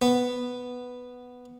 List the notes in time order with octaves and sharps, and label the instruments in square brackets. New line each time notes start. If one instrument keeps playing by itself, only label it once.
[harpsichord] B3